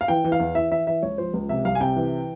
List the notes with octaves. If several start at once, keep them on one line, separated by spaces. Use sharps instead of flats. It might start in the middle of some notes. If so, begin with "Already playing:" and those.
F5
E3 G5
E3
F5
E2
E3 E5
E3 E5
E3 E5
C#2 C#5
F3 C5
C#2
C3 E5
C2 F5
G#5
C3 G5
E3